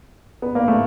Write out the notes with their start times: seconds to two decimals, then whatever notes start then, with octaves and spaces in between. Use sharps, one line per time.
0.42 B3
0.55 A#3
0.68 A3